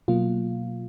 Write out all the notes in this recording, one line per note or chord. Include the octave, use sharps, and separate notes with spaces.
B2 F#3 A#3 F4